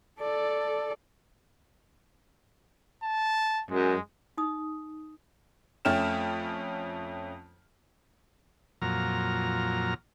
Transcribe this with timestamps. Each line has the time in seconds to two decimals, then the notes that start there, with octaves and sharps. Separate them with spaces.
0.20 A4 D5
3.03 A5
3.71 F#2 G#3
4.38 D#4 D#6
5.85 F2 A3 C#4 G5 F6 E7
8.82 F2 A#2 F#3 A#5 F6